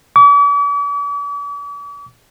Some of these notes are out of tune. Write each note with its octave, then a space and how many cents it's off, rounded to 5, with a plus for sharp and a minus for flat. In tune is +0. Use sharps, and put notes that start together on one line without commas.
D6 -45